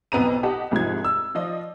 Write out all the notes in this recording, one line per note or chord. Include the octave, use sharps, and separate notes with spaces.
B1 F2 B3 C4 A#5 D#7
G4 D#5 F#5 A5
C2 G#2 F3 G#6
E6
F3 F4 D5 D#5